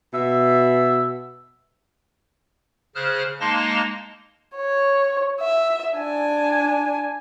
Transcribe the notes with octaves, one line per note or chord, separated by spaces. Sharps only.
B2 E5
C#3 G#4 C5 F6 F#6
G#3 A#3 D#4 A5 C6 A#6
C#5
E5
D4 G#5